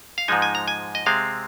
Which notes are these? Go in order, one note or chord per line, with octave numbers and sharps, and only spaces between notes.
F5
G#2 F3 G#3 D#4 G#5
G#5
A#5
G#5
D#5
C3 G#3 C4 F5